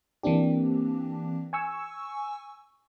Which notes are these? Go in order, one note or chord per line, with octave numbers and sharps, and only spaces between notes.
E3 A#3 C4 D4 G4
G#5 C#6 E6